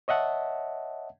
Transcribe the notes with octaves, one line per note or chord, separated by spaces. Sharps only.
C#5 D#5 E5 F#5 A5